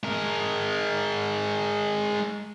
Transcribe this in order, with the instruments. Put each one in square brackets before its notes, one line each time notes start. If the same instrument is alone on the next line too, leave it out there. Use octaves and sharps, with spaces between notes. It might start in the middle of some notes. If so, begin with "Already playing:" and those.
[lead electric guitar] G#3 A#4